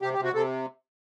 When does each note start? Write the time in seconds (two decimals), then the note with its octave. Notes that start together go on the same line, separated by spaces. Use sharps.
0.02 C3 G4
0.13 G4
0.18 C3
0.24 F#4
0.34 C3 A4